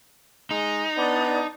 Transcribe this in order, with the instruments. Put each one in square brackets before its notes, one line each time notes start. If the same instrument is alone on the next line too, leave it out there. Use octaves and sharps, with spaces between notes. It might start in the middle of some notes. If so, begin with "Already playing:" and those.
[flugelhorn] G#3 [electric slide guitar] D#4
[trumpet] B3 [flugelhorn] D4 [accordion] D5